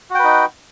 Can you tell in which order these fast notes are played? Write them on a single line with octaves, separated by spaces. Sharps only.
F#4 G5 B4 D#4